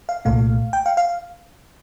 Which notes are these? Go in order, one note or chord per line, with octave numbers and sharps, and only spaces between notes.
F5
C2 A#2 A3 F5
G5
F5
F5